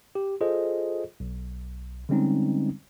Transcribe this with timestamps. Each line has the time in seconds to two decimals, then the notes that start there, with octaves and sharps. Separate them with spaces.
0.15 G4
0.41 F4 G#4 A4 C5 D#5
1.20 B1
2.09 D3 G3 G#3 C4 C#4 D#4